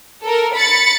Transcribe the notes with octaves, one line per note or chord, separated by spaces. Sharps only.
A4 A#4
B5 A6 C#7